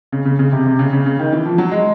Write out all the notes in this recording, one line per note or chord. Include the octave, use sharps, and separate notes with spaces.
C#3
C#3
C#3
C3
C3
C#3
C#3
C#3
D#3
E3
F3
F#3
G#3